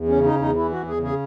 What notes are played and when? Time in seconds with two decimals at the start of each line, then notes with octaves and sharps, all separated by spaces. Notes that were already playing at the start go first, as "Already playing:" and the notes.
Already playing: E2
0.09 C#4
0.15 C#3
0.24 D#4
0.35 E2 D#4
0.56 E3 E4
0.71 E2 F#4
0.87 G#4
0.98 C#3
1.03 G#4